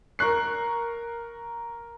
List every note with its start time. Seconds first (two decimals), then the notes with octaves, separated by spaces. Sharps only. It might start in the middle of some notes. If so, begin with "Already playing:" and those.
0.19 A#4 C#6 F#6 C7